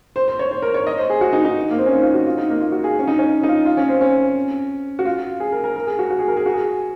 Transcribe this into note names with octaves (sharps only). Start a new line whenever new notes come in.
C5
C5
C#5
C5
A#4
C#5
D#5
C5
G#4
F#4
D#4
D#4
A#3
C4
C#4
D#4
F4
F#4
F4
D#4
A#3
F4
F#4
G#4
C#4
D#4
C#4
D#4
F4
F4
C#4
C4
C#4
F#4
F4
G#4
A#4
A#4
A#4
G#4
F#4
F#4
G#4
A#4
G#4
F#4
G#4